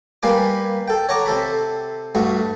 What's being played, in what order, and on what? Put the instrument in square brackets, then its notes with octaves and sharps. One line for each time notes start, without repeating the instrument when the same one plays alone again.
[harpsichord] G3 A#3 B4 G#5 D6
A4 G5
C#5 F#5 A#5 D6
C3 A4 B5
G2 A3 F#4